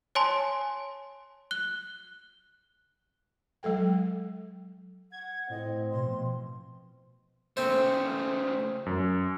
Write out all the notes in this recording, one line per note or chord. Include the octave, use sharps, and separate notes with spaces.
C#5 G#5 A5 C6
F#6 G7
F#3 G#3 A4 G5
F#5 G#6
A2 C4 D#5
B2 F3 C6
C#3 A3 C4 C5
F#2